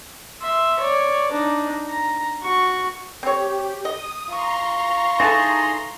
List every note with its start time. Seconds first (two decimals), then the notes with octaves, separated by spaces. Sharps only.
0.42 E5 C6
0.80 C#5 D5
1.31 D4 D#4
1.89 A#5
2.43 F#4 C#6
3.23 C4 G4 C#5
3.85 D#5 D#6
4.28 F4 A#5 C6 C#6
5.20 E3 D#4 G#4 A4 A5